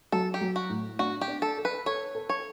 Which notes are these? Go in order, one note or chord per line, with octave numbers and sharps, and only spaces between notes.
F#3 A4
G4
F#3
F#4
A2
D4 F#4
G4
D4
A4
A4
B4
A4 C#5
A4
C#5